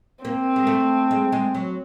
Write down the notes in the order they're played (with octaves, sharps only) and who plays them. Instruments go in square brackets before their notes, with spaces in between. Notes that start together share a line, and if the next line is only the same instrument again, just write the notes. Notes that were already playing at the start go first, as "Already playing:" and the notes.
[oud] A#3 [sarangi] C4
[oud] G#3
A3
G#3
G#3
F#3